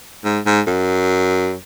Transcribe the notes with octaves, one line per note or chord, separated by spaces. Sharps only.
G#2
G#2
F#2